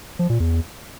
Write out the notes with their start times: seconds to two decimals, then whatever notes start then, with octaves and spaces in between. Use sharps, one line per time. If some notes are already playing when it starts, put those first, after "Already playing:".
0.19 F3
0.30 A#2
0.40 E2